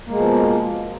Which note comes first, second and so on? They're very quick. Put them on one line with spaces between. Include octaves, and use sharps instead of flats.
A#3 G#3 B2 F3